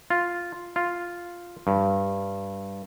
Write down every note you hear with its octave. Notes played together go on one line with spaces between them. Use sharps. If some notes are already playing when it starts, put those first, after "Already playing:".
F4
F4
G2